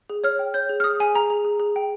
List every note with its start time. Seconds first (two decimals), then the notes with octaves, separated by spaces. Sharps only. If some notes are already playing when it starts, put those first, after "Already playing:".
0.10 G#4
0.24 C#5 F6
0.39 G5
0.54 C#5 G6
0.69 G#4
0.80 F6
0.84 G#4 D#6
1.00 G#4 G#5
1.15 G#4 A#5
1.30 G#4
1.45 G#4
1.60 G#4
1.76 G5